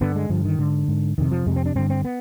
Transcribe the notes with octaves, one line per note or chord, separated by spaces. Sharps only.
G2 D3 B3
G#3
G2 D3 F3
D#3
G#2 D3
G#2
F2 C3 D#3
F3
F2 C3 G#3
C4
D4
G2 D3 C4
C4
B3